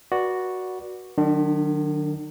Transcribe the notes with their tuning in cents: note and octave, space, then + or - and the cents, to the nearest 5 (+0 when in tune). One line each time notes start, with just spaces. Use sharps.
F#4 +0 B4 -35 D5 +0
D#3 -40 F#3 +0 D4 +0